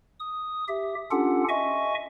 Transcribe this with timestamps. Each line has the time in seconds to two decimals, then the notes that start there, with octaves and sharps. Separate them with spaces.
0.20 D#6
0.68 G4 E5
1.11 C#4 D4 F4 G4 A4 F#5
1.49 D#5 E5 G#5 C#6